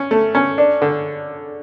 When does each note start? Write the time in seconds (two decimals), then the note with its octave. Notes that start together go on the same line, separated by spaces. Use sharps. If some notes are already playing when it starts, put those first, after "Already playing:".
Already playing: C#4
0.11 A3
0.35 C#4
0.58 D4
0.82 D3